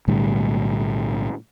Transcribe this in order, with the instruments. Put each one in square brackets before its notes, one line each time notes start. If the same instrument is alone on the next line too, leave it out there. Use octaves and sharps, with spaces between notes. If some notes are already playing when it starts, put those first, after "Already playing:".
[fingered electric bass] B1 A2 D3 G3